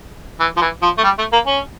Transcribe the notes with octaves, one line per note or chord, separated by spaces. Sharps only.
E3
F3
E3
F3
A3
G3
A3
A#3
C#4